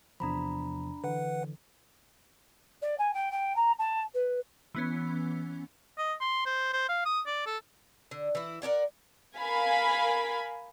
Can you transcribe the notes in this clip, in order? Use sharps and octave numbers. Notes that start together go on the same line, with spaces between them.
E2 C3 F3 D4 A#5 B5
D3 E3 B4 F#5
D5
G#5
G5
G5
A#5
A5
B4
E3 B3 C#4
D#5
C6
C5
C5
F5
D#6
D5
A4
D3
E3 E4
A#4 C#5 D5 F#5
A#4 F5 G#5 B5